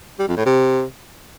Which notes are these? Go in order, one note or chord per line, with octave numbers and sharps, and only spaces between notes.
G3
F2
A2
C3